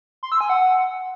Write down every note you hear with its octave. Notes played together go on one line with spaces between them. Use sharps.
C6
E6
G#5
F#5